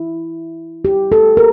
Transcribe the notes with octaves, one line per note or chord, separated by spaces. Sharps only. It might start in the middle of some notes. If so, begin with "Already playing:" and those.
Already playing: E4
G4
A4
A#4